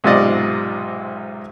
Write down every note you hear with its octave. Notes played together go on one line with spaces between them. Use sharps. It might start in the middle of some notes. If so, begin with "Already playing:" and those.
B1 G#2 C3 F4 D5 D#5